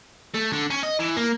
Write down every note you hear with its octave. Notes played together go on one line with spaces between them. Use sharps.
A3
D3
C#4
D#5
E3
A#3